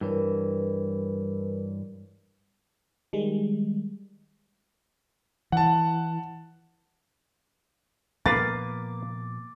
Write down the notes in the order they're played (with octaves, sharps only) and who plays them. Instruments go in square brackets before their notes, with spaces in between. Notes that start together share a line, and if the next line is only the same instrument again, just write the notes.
[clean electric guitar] G2 E3 [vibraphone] A#4 B4 C#5
[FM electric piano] D#3 G3 G#3
[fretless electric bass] E3 [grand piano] F#5 A5
[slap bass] A#2 F3 B3 [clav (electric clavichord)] A#3 B4 F5 [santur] D6 [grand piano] A6